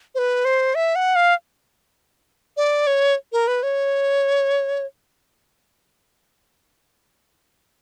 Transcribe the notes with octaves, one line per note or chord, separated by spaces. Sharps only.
C5
B4
C5
E5
F#5
F5
D5
C#5
A#4
B4
C#5